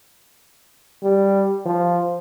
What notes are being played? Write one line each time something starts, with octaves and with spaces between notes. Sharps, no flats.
G3
F3